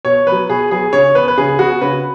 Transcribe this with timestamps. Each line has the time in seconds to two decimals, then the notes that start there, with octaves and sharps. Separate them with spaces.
0.05 B2 C#5
0.27 F#3 B3 B4
0.49 B2 G#4
0.71 F#3 B3 G#4
0.93 C#3 C#5
1.15 B3 B4
1.28 B4
1.37 C#3 G#4
1.59 B3 F#4
1.81 C#3 B4